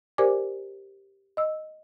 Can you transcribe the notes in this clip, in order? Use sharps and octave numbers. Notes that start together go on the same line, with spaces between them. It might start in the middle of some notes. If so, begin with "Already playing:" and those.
G4 A#4 C5 D5 G#5 D6
D#5 E6